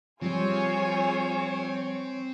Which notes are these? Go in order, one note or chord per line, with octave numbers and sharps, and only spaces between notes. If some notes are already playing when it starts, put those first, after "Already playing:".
F3 G3 C4 F4 G#4 C#5 G#5